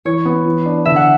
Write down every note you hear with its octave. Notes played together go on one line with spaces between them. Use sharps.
E3 C#5
B3
E3
D4
D3 E5
F#5